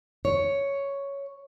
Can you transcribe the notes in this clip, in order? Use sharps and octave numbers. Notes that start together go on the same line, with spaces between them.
C#5